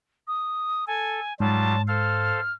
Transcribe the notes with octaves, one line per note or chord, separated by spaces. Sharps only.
D#6
A4 G#5
G#2 F#3 G3 F4 A5
A4 C5 F5 F6